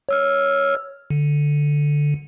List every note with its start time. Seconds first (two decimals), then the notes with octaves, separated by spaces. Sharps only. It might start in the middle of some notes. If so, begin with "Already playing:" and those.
0.09 C#5 E6 F6
1.10 D3